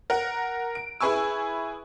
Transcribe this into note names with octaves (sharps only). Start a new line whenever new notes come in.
A#4 F#5
D7
E4 G#4 B4 G#5 C#6 E6